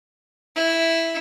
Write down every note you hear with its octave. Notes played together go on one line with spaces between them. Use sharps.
E4